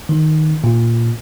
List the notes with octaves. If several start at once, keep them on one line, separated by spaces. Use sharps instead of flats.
D#3
A#2